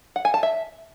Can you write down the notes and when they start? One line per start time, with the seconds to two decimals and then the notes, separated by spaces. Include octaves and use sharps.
0.16 F#5
0.25 G#5
0.34 A5
0.43 E5